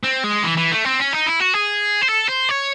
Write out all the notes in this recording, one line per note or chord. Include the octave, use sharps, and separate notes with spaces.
C4
G#3
E3
E3
A3
C4
C#4
D#4
E4
F#4
G#4
C5
A4
C5
C#5